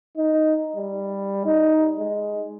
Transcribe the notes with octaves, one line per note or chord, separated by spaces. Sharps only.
D#4
G3
D#4
G#3